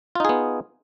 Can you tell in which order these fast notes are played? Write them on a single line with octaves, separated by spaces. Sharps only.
F4 D#4 G#4 B3